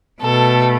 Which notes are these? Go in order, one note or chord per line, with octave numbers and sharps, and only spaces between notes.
B2 A3 A4